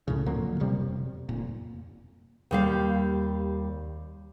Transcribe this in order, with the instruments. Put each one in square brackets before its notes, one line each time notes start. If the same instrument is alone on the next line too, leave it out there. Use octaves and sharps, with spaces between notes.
[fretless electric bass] C#2 A2 C#3
F2 D3 F#3 A#3
E1 C3 G3
F1 A#2
[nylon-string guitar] D#2 G3 F5